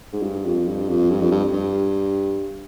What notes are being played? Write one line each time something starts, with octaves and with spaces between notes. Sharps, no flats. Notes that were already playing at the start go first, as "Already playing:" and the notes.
G#2
G2
F2
G2
F2
G2
F2
G2
G2